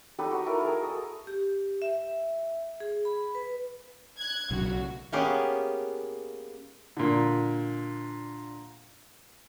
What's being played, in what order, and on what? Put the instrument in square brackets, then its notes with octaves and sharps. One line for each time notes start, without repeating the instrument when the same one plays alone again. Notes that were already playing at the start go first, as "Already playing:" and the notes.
[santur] D#4 G4 A4 B4
D#4 F#4
E4 A4 A#4
G#4 A#4
A4 D#6
[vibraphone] G4
E5
G#4
B5
B4
[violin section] F#6 G#6
[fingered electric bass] B1 C#3 [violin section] F#4
[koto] A#3 B3 C#4 G4 G#4
[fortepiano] A#2 D3